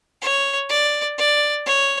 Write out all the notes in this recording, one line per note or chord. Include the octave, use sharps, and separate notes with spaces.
C#5
D5
D5
C#5